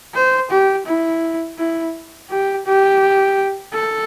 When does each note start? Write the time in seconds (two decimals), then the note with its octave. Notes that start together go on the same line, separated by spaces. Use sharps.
0.14 C5
0.51 G4
0.86 E4
1.58 E4
2.30 G4
2.66 G4
3.74 A4